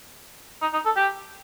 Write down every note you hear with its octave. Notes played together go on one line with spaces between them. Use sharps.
D#4
D#4
A4
G4